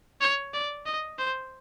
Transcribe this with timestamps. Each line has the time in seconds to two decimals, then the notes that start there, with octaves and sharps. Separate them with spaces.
0.21 C#5
0.53 D5
0.86 D#5
1.19 C5